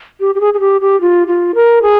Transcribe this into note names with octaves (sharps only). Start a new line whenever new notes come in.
G4
G4
G#4
G#4
G4
G4
F4
F4
A#4
G#4